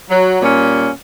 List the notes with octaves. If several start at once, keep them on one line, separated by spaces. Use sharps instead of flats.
F#3
A#2 G3 C#4